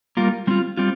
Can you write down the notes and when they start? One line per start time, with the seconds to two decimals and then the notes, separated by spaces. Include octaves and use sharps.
0.17 G3 A#3 F4 A#4
0.47 G3 C4 F4
0.77 G3 C4 F4